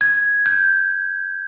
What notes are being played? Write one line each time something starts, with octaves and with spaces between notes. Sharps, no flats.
G#6
G6